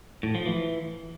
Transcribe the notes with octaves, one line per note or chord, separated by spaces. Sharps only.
A2
F3
E3